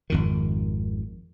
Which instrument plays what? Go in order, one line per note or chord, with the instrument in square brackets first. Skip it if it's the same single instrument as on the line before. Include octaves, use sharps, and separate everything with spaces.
[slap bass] G#1 F2 D#3